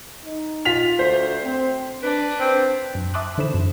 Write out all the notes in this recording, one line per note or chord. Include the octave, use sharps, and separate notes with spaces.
D#4
F4 B6 F7
D2 C5
C4
D4 B4
C4
F#2
E5 A5 C6 D6 D#6 F#6
D3 E3 A4 C5 B5 E7
F#2